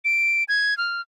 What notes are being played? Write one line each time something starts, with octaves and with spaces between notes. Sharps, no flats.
D7
G#6
F6